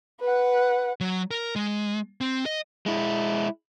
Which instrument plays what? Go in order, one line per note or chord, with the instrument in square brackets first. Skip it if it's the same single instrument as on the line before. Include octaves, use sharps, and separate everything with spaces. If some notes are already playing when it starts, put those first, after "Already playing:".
[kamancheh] B4 F#5
[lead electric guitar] F#3
A#4
G#3
C4
D#5
[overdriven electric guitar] G#3 E4